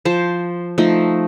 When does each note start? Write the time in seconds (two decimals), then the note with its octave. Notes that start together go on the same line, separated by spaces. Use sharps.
0.05 F3 C5 A5
0.78 F3 A3 D#4